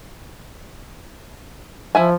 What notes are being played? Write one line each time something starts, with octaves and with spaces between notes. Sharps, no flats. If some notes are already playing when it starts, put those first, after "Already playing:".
F3 E4 E5 G#5